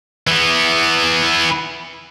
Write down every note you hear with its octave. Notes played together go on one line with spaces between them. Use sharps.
E3 B3